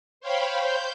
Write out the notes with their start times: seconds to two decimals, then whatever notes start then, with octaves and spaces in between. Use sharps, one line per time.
0.20 C5 C#5 F5 G5 B5
0.62 C5 G6